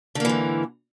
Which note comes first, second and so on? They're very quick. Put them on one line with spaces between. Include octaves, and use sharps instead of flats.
D3 A#3 E3 G#2